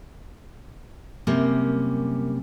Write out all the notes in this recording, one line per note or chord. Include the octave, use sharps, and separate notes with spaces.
F#2 C3 G3 A#3 C#4